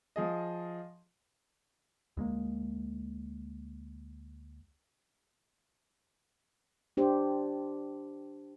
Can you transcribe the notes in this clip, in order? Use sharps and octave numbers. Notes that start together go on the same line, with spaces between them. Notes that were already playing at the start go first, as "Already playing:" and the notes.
F3 G#4 D#5
D2 G#3 A#3
D4 G4 C5